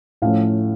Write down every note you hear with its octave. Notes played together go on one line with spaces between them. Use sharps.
A2 F3 A3 C#4 F5